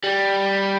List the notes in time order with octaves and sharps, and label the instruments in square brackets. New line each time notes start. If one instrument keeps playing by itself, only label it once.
[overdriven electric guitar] G3